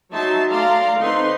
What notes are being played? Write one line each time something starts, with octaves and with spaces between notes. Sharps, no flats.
F#3 D#4 E5 A5 C6
A3 D5 F5 A#5 C6
D3 C4 D#4 B4 C6